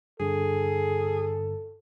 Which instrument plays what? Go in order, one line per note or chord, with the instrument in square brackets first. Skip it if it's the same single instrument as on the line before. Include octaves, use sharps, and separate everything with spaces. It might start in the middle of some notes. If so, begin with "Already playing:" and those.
[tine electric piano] G2 D3 [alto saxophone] G#4 [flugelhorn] A4